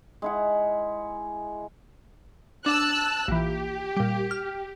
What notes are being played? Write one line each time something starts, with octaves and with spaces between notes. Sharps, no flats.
G#3 E4 F#5
D4 A5 E6 F#6
A#1 E3 G4
A#2 G3
F6